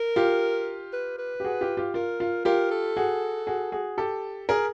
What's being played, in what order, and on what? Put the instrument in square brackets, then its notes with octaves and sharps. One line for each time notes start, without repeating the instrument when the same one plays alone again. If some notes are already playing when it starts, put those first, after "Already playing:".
Already playing: [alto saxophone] A#4
[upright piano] F4 G4
[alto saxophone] B4
B4
[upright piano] G4
F#4 G#4
F4 G4
F4 G4
[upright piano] F4 [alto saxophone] A#4
[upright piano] F4
[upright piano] F4 G4 [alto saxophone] A#4
[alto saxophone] A4
[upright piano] F#4 G#4
F#4 G#4
F#4 G#4
G4 A4
G#4 A#4